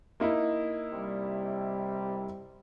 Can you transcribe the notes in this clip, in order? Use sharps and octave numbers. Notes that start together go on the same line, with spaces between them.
A#3 D#4 E4
C3 G3